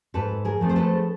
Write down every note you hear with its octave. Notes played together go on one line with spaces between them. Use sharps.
G#2 A4 B4
G#4 A#4
F3 A3 C4
C5
A4 B4